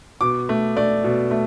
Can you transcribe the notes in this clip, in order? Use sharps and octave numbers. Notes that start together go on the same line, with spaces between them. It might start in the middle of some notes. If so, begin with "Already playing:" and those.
B2 D6
A3
A3 D5
B2
A3